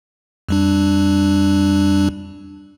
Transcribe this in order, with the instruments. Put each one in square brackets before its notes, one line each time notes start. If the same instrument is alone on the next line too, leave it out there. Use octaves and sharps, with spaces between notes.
[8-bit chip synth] F2 G3 D4